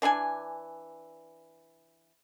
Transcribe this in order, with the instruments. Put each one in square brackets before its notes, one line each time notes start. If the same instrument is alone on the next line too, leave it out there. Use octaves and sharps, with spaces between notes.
[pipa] E3 D4 D5 G#5